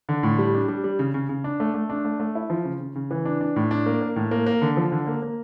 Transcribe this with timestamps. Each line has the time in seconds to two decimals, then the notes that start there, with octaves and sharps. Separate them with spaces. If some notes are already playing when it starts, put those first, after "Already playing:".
0.09 D3
0.23 A2
0.38 G3
0.54 D4
0.68 G3
0.84 G3
0.99 C#3
1.14 C#3
1.29 C#3
1.44 D4
1.60 A3
1.74 A3
1.90 D4
2.05 A3
2.20 A3
2.35 E4
2.50 F3
2.65 C#3
2.80 C#3
2.96 C#3
3.11 E3
3.25 D4
3.41 D4
3.56 A2
3.71 D4
3.86 A#3
4.01 A#3
4.16 A2
4.31 A#3
4.46 A#3
4.62 D3
4.77 F3
4.92 D3
5.07 A#3
5.22 A#3